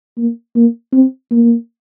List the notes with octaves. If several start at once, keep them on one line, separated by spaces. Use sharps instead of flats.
A#3
A#3
C4
A#3